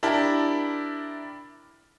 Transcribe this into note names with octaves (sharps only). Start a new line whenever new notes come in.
D4 E4 G4 A#4 A5